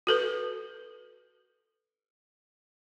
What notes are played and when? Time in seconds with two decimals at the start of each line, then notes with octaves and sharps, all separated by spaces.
0.07 F#4 A4 B4